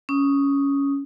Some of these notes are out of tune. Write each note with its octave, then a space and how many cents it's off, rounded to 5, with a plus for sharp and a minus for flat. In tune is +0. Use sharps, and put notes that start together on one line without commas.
C#4 +10 D#6 +0